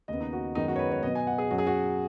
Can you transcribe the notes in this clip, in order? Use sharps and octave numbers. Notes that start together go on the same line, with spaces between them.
D#2 C#3 B3 D#5
D#4
F#4
F#2 D#3 G#3 B3 D#4
F#4
C#5
B4
C#5
B2 F#3 B3 D#5
G#5
F#5
G#4
F#2 F#3 C#4 F#4
G#4
F#4